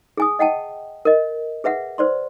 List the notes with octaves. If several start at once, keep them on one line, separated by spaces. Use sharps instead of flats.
G#4 G#5 D#6
D#5 F#5 G5 A5
A#4 D#5
G#4 B4 E5 F#5
B4 C5 D5 C6